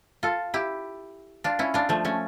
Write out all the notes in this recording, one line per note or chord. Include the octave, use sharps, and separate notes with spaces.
F4 A4
E4 G4
D4 F4
C#4 E4
D4 F4
F3 A3
A3 C#4